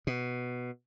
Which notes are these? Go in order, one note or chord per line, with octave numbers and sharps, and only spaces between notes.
B2